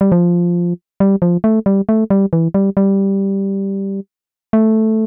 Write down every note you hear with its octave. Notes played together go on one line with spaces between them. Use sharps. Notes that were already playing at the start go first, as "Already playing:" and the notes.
G3
F3
G3
F3
A3
G3
A3
G3
E3
G3
G3
A3